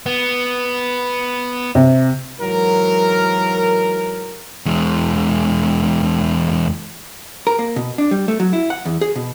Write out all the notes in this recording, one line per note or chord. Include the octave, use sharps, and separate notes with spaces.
B3
C3
G#2 E3 F#3 A#4
E2 G#3
A#4
A#3
B2
D4
G3
A3
F#3
E4
F#5
E2
G#4
B2